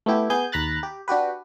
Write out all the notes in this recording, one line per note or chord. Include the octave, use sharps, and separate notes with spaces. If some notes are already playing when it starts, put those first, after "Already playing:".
A3 B3 E4 G4
B3 G#4 G#5 G6
D#2 A#5 B5 F#6 A6
G4
D4 F#4 G4 B4